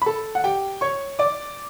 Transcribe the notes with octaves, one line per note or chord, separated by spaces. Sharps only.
B5
A4 A5
F#5
G4 G5
C#5 C#6
D5 D6